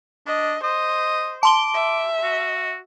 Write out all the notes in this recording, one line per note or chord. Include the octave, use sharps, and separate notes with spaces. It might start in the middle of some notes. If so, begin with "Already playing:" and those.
D4 D#5
C5 D#5
A5 C6 D6 G7
E5
F#4